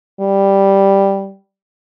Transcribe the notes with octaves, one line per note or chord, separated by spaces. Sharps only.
G3